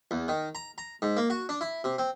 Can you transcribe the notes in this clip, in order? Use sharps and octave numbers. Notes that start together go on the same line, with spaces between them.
E2
D#3
A#5
A#5
G#2
A#3
F#4
D4
E4
C3
C4